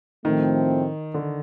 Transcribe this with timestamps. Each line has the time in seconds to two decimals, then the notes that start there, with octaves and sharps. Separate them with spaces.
0.25 A2 D#3 F3 A3 C4
1.14 D3